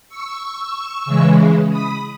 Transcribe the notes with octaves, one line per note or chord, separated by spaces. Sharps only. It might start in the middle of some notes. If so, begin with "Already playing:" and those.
C#6 E6
C#3 E3 G#3
B5 D#6